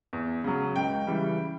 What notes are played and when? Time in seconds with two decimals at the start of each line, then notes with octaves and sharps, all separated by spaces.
0.13 E2
0.44 C#3 F#3
0.76 C#2 G5
1.07 C#3 E3 G3